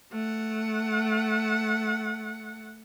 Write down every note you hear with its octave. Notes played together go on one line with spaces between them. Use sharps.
A3 F#5